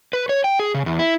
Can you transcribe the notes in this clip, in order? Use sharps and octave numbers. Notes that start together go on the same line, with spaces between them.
B4
C#5
G5
G#4
C#3
E2
E4